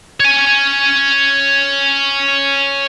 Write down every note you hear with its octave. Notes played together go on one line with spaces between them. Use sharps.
C#5 G#5